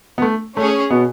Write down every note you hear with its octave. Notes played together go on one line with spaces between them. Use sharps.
B3
A3
A3 C#4 G#4 C#5
B2 B3